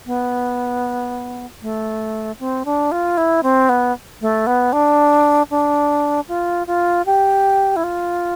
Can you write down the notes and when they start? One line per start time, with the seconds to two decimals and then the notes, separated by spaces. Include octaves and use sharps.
0.06 B3
1.62 A3
2.40 C4
2.65 D4
2.92 F4
3.17 E4
3.43 C4
3.69 B3
4.21 A3
4.47 B3
4.73 D4
5.50 D4
6.28 F4
6.67 F4
7.06 G4
7.76 E4
7.84 F4